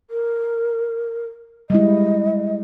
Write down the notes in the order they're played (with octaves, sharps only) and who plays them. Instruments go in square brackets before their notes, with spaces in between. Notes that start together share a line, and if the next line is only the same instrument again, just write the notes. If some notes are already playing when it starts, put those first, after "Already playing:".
[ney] A#4
[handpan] G3 G#3 E4 [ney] D#5